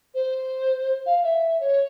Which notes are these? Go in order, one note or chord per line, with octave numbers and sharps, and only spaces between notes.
C5
F5
E5
C#5